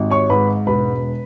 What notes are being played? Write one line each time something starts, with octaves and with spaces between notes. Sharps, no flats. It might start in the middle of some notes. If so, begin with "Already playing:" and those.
Already playing: G#1
C#5 C#6
G#2 B4 B5
E1 B4 B5